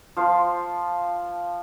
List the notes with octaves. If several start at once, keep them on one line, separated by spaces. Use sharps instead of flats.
F3 F5 C6